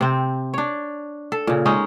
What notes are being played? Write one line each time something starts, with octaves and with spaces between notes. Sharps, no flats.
C3 C4
D4 C#5
A4
A#2 C#3
G#3 C#4 D#4